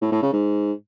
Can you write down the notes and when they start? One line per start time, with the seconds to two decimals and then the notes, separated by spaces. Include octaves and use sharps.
0.02 A2
0.12 A2
0.22 C#3
0.33 G#2